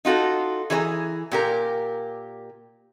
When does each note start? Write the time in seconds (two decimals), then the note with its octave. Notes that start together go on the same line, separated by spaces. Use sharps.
0.05 D#4 F4 F#4 A4
0.70 E3 G#4 C#5 A#5
1.32 A#2 G4 A#4